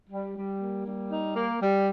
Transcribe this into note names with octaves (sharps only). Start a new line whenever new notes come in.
G3
G3
A#3
G3
D#4
A#3
G3